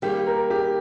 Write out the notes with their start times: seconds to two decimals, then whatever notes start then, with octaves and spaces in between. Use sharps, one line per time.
0.02 D#3 G3 A#3 G4
0.26 A#4
0.50 G4